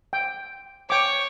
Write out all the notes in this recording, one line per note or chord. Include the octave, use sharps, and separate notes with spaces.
G5
C#5 G5 D6